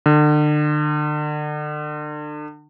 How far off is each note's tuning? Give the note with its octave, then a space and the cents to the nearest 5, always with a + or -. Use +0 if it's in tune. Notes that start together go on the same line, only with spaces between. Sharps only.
D3 +35